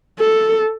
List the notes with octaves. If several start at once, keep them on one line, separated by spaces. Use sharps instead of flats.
A4